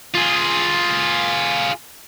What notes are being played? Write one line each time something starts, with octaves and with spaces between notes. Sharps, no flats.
F4 G#4